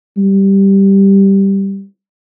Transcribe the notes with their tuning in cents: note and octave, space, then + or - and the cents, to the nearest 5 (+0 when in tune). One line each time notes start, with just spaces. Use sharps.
G3 +0